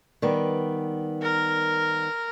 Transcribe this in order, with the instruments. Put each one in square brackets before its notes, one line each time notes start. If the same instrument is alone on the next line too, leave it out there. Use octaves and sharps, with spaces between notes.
[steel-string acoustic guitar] D#3 G3 B3
[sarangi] A#4